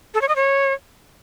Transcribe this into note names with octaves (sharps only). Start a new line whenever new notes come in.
A4
C#5
D#5
C#5